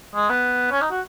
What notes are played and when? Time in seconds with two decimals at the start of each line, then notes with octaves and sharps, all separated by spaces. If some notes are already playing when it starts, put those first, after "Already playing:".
0.15 G#3
0.30 B3
0.72 C#4
0.82 D#4
0.91 F#4